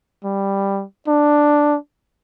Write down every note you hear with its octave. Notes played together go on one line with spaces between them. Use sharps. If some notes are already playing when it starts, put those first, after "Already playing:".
G3
D4